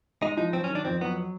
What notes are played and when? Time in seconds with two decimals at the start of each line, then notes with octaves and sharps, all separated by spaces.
0.22 G#3 D#4
0.37 F3 D#4
0.53 F#3 C4
0.64 C#4
0.70 D#3
0.75 D4
0.85 F2 C4
1.01 F#3 B3